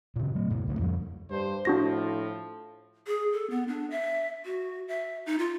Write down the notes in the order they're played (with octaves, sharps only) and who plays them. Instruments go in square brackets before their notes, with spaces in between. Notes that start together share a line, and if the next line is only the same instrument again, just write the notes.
[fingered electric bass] A#2 C#3
F#3 A3
G#2 B2
C#2 A2 D3 A3
F2 F3 G3
[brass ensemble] G2 C5
[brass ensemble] A2 F3 [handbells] D4 F#4 A#6
[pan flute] G#4
A4
B3
D4
E5
F#4
E5
D#4
F4